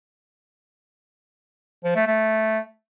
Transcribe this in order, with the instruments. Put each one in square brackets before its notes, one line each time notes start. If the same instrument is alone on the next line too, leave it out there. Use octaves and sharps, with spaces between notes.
[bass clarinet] F3
A3
A3